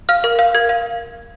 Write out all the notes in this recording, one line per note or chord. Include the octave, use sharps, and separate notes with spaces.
F5 F6
A#4
F5
A#4 G#6
F5